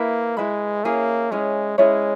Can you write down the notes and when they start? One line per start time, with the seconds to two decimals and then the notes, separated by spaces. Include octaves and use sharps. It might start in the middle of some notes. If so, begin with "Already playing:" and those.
Already playing: A#3 E4 B4 E5 B5
0.37 G#3 E4 B4 E5 B5
0.85 A#3 C#4 E4 G#4 C#5
1.31 G#3 C#4 E4 G#4 C#5
1.78 G#3 C#4 E4 G#4 C#5